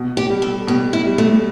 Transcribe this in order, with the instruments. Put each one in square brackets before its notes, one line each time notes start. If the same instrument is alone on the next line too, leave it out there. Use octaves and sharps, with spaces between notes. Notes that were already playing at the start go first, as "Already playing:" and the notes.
Already playing: [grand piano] B2
[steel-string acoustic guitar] G4
[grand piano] G3
[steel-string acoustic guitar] A4
[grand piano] B2 [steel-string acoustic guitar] G4
[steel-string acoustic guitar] E4
[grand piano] G3
[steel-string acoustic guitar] A3